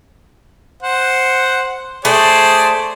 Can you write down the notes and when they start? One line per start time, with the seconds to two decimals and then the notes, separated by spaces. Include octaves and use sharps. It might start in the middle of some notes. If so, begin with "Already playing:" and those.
0.83 C5 F#5
2.05 A3 G#4 C5 D5